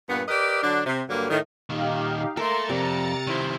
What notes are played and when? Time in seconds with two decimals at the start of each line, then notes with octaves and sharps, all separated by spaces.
0.08 G2 A#2 B3
0.28 G4 A#4 B4 D5 D#5
0.63 D3 F#3 D4
0.86 C3
1.09 G2 D3 F#3 A#3
1.30 A2 D#3
1.70 A#2 D#3 D#4 G4 F5
2.37 A#3 A4 A#4 E5 A#5 C6 A6 C#7
2.70 F2 C3 D5
3.27 D#3 F3 E4 C5